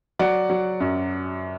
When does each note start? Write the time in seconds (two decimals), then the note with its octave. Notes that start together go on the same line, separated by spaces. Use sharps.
0.19 F#3 D5 F#5
0.50 F#3
0.80 F#2